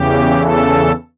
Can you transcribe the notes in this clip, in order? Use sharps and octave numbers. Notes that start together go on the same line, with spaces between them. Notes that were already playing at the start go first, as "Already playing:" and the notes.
Already playing: E2 C#3 E3 G4
A4